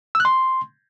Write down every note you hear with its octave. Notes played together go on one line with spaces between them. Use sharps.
E6
F#6
C6